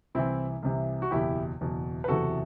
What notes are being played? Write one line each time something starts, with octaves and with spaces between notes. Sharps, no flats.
C2 C3 E3 C4 E4
C2 C3 E3
F#4
F#1 E2 B2 E4 G4
F#1 E2 B2
B4
F#1 E2 C3 E3 F#4 A4